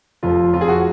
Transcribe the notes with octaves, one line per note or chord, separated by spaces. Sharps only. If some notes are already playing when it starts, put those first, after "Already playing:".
F1 F2 F3 F4
F1 F2 F3 F4
G#4
F#4